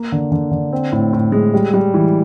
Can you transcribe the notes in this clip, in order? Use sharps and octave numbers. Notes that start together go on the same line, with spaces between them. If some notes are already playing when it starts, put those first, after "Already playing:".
Already playing: A#3
D3
D3
D3
C4
A2
A2
G#3
G3
G3
E3